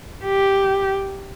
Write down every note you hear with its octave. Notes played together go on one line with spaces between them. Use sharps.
G4